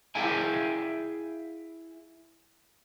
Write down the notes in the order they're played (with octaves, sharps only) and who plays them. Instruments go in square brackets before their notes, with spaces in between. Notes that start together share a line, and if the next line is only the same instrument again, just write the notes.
[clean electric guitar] E4 G#4 E5 F5 G5 G#5